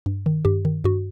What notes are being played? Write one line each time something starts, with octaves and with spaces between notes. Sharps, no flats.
G2
D#3
G2 G4
D#3
G2 F#4